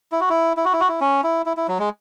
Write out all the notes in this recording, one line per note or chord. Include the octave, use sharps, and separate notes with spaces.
E4
F#4
E4
E4
F#4
E4
F#4
E4
C#4
E4
E4
E4
F#3
G#3